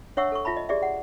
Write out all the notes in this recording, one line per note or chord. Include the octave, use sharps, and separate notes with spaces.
D4 C#5 E5 F#5 C#6 E6
A4 C#6
F4 E5 A5 B5
D#5
G4 G#4 D5 E5
F#5